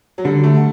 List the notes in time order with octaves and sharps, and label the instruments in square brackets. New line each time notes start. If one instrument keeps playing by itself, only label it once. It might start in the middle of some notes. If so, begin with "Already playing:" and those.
[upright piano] F#3
[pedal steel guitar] D3 [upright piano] G3
[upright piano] A3